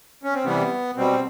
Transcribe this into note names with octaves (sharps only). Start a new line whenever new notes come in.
C#4
C4
C3 E3 G3 B3
B2 G3 C4